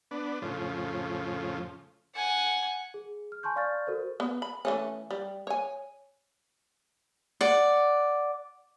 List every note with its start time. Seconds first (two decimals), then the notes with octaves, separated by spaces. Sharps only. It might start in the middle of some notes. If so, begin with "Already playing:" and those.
0.11 B3 D4
0.42 F2 A2 C#3 F3
2.16 F#5 G#5
2.94 G#4
3.32 F6
3.43 G#5 A5 C6 C#6 G6
3.56 D5 F5 C#6 F6 G6 A6
3.87 F#4 A4 A#4 C5
4.20 B3
4.42 B5
4.65 E3 A3 C#4
5.11 G3
5.47 C#5 G#5
7.41 D5 F#5